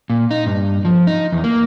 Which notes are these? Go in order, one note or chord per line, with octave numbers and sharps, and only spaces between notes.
A#2
D#4
G2
F3
D#4
E2
A#3